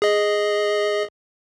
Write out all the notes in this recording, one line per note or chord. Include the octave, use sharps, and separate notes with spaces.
G#4 D#5